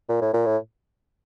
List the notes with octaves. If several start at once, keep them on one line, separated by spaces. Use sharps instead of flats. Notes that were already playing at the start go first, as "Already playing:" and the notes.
A#2
A2
A#2
A2